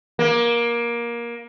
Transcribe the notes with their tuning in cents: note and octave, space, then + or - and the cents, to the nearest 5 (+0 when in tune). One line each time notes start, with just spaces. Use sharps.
A#3 +20